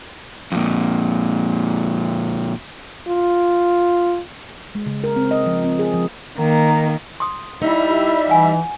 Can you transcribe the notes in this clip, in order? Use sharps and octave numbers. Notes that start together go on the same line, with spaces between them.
F2 A#2
F4
G#3
C#3
A#4
C4
D#5
F3
C4
G#4
F3
D#3 A#3
C6 D#6
G3 D#4 E4 E5
F4
E3 F#5 G#5